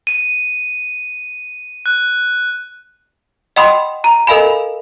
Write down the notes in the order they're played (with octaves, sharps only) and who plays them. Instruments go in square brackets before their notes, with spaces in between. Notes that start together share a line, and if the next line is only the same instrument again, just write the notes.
[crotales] D#7
F#6
[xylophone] D#5 F#5 G5 B5 C6 D#6
A#5
A4 A#4 D#5 F5 G#5 B5